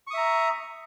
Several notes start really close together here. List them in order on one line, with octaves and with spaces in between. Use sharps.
C#6 D#6 E5 A#5